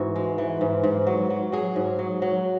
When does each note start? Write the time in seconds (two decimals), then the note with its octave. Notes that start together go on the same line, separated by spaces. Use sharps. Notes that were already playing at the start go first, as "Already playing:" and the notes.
Already playing: G#2 E3 E4 F#4
0.16 G#3
0.38 E3
0.61 G#2
0.84 G#2
1.07 F#3
1.30 F#3
1.52 F#3 G#4
1.76 G#2
1.99 F#3
2.22 F#3